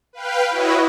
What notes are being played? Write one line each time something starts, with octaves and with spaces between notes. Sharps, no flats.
B4 F5 G5
E4 F#4 B4 C#5 D#5